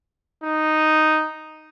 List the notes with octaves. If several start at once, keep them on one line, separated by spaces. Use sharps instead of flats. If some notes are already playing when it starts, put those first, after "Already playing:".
D#4